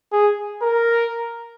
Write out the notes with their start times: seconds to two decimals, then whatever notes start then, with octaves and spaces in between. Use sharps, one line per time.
0.12 G#4
0.62 A#4